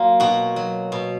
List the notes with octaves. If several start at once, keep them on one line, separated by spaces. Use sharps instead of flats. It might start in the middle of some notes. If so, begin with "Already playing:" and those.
Already playing: F#3 A#3 F4
B2 F#4
F#3
B2